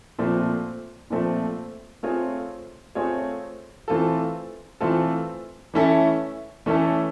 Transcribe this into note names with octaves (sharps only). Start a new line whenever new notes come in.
A#2 F3 A3 C4
A#2 F3 A3 C4
A3 C4 F4 G#4 C#5
A3 C4 F4 G#4 C#5
E3 A3 C4 F4 A4
E3 A3 C4 F4 A4
E3 A3 C#4 E4 A4
E3 A3 C#4 E4 A4